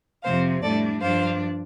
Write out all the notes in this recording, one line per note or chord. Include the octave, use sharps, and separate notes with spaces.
F2 C3 F3 C4 C5 F5
A2 G3 D4 A4 D5
G2 F3 D4 C5 F5